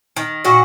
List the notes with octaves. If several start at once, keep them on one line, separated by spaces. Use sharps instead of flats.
D#3
A#2 F#4